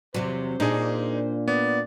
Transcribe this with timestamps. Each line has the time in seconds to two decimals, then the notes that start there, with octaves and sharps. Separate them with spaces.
0.14 E2 C3 F#3 C5
0.60 A#2 D4 D#4 G#4
1.48 B3 D5